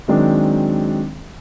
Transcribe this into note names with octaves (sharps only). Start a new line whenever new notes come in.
D#3 F#3 G#3 C4 D4